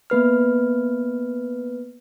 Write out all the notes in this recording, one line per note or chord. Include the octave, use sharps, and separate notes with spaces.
A#3 B3 B4 F6